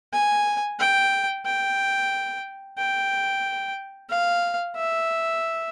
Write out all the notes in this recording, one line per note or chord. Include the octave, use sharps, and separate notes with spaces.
G#5
G5
G5
G5
F5
E5